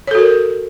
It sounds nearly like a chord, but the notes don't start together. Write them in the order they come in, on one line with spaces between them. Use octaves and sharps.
C#5 A4 F#4 A#4